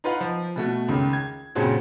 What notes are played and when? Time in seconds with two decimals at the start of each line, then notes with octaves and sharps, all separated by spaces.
0.04 D#4 F4 B4 F5 F#5
0.20 F3
0.56 B2 A3 F#4
0.88 C#2 D#3
1.13 G#6
1.55 G2 A#2 C#3 C4 C#4 F#4